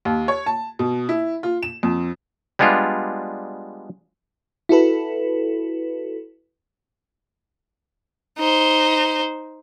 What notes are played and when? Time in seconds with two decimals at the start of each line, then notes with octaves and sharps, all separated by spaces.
0.05 D#2
0.28 C#5
0.46 A5
0.79 B2
1.09 E4
1.43 F4
1.63 E7
1.83 F2
2.59 G3 G#3 B3 D4 F4
4.69 E4 F#4 A4 B4
8.38 D#4 C5